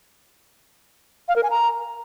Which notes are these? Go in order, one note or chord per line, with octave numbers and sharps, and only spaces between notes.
F5
A#4
G#5
A#5